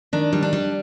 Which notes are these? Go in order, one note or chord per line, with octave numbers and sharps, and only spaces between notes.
D#3 D4
G3
D4
G3